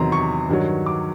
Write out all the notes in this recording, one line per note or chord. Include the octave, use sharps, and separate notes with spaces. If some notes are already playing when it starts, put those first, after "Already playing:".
Already playing: E2 C3 D#3 F#3 A#5 C6
C#6
G2 D#3 F#3
D6